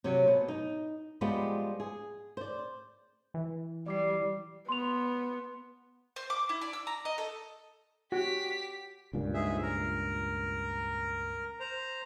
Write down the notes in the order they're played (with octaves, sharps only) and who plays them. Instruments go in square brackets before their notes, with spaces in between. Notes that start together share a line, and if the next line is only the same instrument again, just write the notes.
[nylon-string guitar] C3 F#3
B2
D#4
F3 G3 G#3 B3 F4 G4
G#4
C5 D5
[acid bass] E3
[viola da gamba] G3 [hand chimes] D5 D6 C7
[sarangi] B3 [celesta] C6 F7
[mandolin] C5
D6
E4
D5
E6
A#5
D#5
A4
[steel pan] F#4 [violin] G4 B6
[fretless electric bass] C#2 G2 A#2
[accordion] G#2 G#4 E5
A#4
C5 A#5